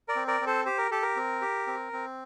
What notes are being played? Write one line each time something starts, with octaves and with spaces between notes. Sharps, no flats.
A#4 D5
C4
A#4 D5
C4
A4 C5
G4 C5
A#4
G4 A4
A#4
C4
G4
C4
C4